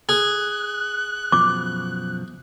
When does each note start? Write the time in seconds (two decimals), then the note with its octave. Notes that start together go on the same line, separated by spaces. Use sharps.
0.09 G#4 F#6
1.32 F#2 B2 F3 D6